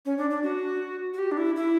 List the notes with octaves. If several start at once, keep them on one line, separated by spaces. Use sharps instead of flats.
C#4
D4
D4
F#4
F#4
G4
D4
E4
E4